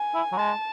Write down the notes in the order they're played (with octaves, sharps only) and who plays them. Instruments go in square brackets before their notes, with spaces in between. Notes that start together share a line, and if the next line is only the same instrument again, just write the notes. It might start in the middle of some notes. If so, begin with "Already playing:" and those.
Already playing: [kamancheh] G#5
[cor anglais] E4
F#3
[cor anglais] G#3 [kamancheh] A5